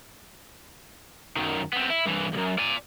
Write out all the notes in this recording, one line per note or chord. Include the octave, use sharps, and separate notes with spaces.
F#2 D#3
B3 C4
E4
G2 E3
C2 F#2
D5 G#5